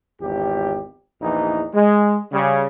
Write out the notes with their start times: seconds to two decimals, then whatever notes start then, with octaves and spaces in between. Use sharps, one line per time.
0.19 G#1 E2 G4
1.21 A#1 E2 E3 D#4
1.73 G#3
2.32 C#3 G3